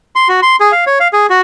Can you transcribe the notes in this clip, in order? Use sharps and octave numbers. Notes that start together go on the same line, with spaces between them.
C6
F#4
C6
G#4
F5
C#5
F5
G#4
F#4